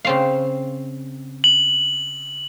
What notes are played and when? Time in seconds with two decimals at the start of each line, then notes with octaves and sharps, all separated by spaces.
0.05 C#3 C4 F5
1.44 F#7